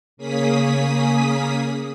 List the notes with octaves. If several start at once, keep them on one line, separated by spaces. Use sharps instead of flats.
C#3 A#3 C#4 G#4 D#6 B6